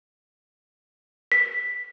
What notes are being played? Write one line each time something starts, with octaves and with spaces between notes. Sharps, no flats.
B6